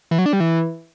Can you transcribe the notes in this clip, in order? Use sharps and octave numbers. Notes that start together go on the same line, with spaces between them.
E3
F#3
D4
G3
E3